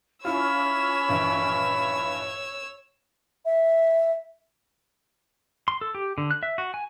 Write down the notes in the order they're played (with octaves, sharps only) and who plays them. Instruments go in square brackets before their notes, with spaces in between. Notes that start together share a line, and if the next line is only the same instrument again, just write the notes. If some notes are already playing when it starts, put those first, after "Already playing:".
[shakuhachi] C#4 [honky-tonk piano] E4 F4 [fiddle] C#5 E6 [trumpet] B5
[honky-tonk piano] A#1 G2 E3
[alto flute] E5
[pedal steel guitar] C6
A4
G4
D3
F#6
E5
F#4
G#5